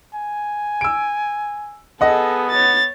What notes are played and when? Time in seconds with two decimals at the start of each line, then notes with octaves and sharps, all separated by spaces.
0.14 G#5
0.81 E6 D7
2.01 B3 G#4 A4 D#5 F#5
2.50 C#5 A6